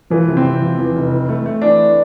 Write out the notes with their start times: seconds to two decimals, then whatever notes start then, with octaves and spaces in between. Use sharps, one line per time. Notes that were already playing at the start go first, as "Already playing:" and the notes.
0.10 E3 F3
0.28 C3
0.37 C4
0.44 C3
0.62 F3
0.79 E2
0.96 F1
1.12 E3
1.29 A3
1.46 A3
1.62 E3 D4